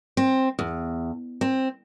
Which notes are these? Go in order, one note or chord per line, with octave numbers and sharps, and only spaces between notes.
C4
E2
C4